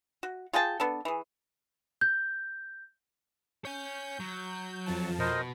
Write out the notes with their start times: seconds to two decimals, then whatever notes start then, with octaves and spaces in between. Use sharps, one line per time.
0.23 F#4
0.53 F4 G#4 G5 A5
0.80 B3 D4 A4
1.05 E3 G#4
2.01 G6
3.65 C#5 G#5 G6
4.20 F#3
4.86 F2 F3 A5
5.20 B2 A#4 C5 D#5